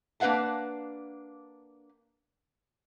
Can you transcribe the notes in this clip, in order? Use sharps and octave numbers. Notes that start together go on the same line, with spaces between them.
A#3 D4 B4 F5 F#5 A5